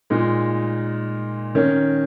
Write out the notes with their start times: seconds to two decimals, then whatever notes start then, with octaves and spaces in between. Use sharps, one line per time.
0.10 A#2 G#3 D#4
1.55 D#3 C#4 A#4